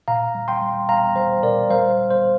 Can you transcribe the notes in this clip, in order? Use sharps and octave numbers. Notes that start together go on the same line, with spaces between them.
A#2 F5 A#5
G3
G5 C6
G3
G3 F5 A#5
G3 C5 F5
A#2 A#4 D5
G3 C5 F5
G3
C5